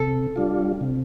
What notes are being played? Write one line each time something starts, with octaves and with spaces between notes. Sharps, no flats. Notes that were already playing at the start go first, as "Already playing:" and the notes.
Already playing: C3 A4
G3 D4 F4
C3